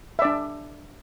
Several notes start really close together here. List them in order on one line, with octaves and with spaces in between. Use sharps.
E5 D5 D4